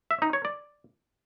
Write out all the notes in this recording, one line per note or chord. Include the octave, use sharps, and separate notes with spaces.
E5
D#4
C#5
D5